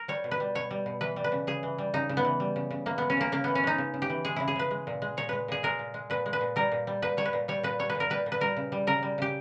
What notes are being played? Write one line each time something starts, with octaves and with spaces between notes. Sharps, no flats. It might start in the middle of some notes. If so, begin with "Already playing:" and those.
Already playing: A#4
G3 C#5
B2
B4
G3
B2 C#5
G3
B2
E3 B4
G3
B4
C#3
C#3 G#4
E3
G3
C#3 D#4
C#3
B3
E3
G3
C#3
C#3
E3 A#3
G#3 B3
C#4
C#3 A#3
C#3 A#3
E3 B3
C#4
G#3 D#4
C#3
C#3
G4
E3
G#3 G#4
C#3 E4
G#4
C#3 B4
G#3
A#2
G#3
A#2 C#5
G#3 B4
A#2 G#4
G#3 A#4
A#2
G#3
A#2 B4
G#3
B4
A#2
G3 A#4
A#2
G3
A#2 B4
G3 C#5
B4
A#2
G3 C#5
A#2 B4
G3 C#5
B4
A#2
A#4
G3 B4
A#2
B4
G3 A#4
C#3
G3
C#3 A#4
G3
C#3 G4